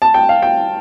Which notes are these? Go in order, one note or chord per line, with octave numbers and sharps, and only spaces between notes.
A5
G5
F5
G5